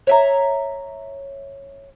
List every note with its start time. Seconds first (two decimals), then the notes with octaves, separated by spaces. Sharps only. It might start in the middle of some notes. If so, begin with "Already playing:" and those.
0.07 C#5 E5 A#5